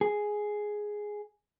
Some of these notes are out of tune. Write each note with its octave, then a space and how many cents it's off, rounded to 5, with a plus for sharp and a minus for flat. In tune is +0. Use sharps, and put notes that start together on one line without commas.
G#4 +5